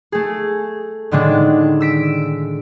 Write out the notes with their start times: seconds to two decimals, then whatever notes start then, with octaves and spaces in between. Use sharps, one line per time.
0.12 A3 G#4
1.11 A2 D3 D#3 G#3 D4
1.80 E6 B6 D7